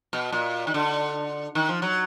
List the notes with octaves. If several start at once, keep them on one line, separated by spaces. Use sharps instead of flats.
B2
A#2
D#3
D3
D#3
F3
F#3